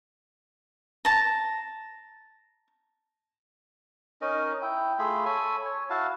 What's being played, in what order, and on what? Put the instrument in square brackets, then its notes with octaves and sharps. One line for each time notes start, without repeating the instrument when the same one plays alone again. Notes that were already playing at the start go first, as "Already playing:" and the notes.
[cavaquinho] A5 A#5
[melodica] C#4 D#4 A#4 D#5
E4 G5
A3 F4 G#4 B5
A4 C#5 G#5 B5
C#5
E4 F#4 F5 A5